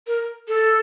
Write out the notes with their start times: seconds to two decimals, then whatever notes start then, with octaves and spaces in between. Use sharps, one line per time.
0.07 A#4
0.48 A4